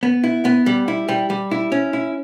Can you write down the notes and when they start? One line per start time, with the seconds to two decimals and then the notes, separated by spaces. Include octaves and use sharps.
0.03 B3
0.24 E4
0.45 B3
0.66 G3
0.88 E4
1.08 G3
1.30 G3
1.51 E4
1.72 C#4
1.93 E4